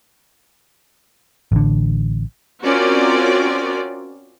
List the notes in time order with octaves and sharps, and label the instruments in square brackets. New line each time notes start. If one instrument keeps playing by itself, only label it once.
[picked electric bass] A1 D3
[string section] C4 C#4 F4 F#4 A#4 D5